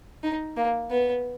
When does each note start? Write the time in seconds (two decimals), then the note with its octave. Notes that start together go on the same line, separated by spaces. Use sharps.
0.23 D#4
0.57 A#3
0.91 B3